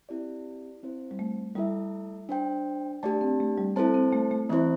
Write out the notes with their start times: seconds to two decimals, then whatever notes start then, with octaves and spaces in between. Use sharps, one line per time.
0.09 C4 E4 G4 D5
0.83 C4 E4 C5
1.11 G3
1.19 A3
1.55 G3 A3 E4 A4 E5
2.29 D4 C5 G5
3.03 A3 D4 G4 D5 A5
3.21 C4
3.40 A3
3.58 G3
3.76 C4 E4 A4 C5 A5
3.94 C4
4.13 A3
4.31 A3
4.50 E3 A3 C4 E4 C5